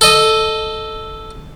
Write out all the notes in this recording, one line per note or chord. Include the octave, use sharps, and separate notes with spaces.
A4 D#5